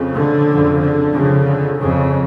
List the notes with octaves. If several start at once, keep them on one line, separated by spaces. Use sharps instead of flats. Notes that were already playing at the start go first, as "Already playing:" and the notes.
Already playing: F2 C#3
D3
F2 C#3
D3
F2 C#3
D3
F2 C#3